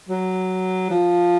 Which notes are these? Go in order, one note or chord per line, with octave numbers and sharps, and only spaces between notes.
F#3
F3